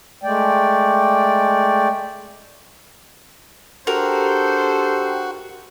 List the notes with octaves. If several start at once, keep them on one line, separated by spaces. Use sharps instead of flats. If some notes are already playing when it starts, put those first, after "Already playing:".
G#3 A3 D5 G5
D4 F#4 G4 A4 A#4 C5